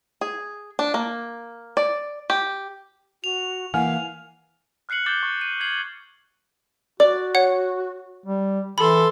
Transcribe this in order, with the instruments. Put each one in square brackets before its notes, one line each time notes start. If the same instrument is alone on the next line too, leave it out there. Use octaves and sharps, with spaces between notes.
[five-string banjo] G#4
D4
A#3
D5
G4
[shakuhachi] F#4 [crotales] F7
[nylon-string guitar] E3 A#3 [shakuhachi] F5 [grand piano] F#5 G#5 F6
[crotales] F6 F#6 C7 C#7 F#7
D6 G6 A6 G7
C#6
D#7
G#6 C7 F#7
[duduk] F#4 [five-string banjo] D5 [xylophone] D6
[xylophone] C#5 F#5
[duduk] G3
[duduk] E3 [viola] A4 C6 [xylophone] B5